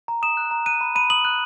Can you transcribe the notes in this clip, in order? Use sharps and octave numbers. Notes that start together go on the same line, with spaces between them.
A#5
D#6 E7
F#6
A#5
F#6 D#7
B5
B5 D#7
D#6 F#7
F#6